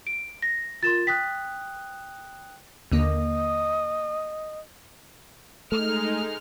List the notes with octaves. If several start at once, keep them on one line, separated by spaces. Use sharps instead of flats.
D7
A#6
F4 A#4 C6 A6 E7
G5 D#6 F#6 B6
D#2 D3 A#3 D#5
G#3 A3 D#4 A4 F6